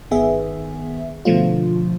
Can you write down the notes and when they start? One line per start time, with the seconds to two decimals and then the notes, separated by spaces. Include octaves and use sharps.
0.11 G1 D#3 B3 G#4 E5
1.25 B2 D3 F3 A3 F4